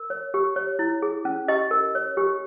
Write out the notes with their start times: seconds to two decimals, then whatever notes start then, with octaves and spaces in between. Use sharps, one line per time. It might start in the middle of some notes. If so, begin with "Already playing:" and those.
Already playing: A#4
0.10 C#5
0.34 G4
0.56 C#5
0.79 E4
1.02 G#4
1.25 C#4
1.48 G4 D#5
1.71 A#4
1.95 C#5
2.17 G4